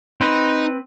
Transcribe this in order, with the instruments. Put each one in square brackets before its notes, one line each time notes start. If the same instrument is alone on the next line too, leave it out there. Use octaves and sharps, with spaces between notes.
[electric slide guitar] C4 B4 [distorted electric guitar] D#4